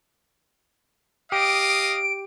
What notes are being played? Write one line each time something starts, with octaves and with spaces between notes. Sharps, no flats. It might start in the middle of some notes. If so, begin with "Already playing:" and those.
G4 D#5 F5 D#6 D7